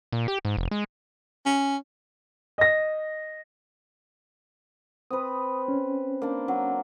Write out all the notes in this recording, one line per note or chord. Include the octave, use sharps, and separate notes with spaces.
A#2
G4
G#2
F1
G#3
C#4
D#5 A#6
C4 B4 D#6
C#4
A#3 D4
F#3